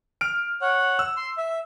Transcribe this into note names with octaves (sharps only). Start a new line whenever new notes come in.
F6 D7
C#5 F#5
E6
C6
E5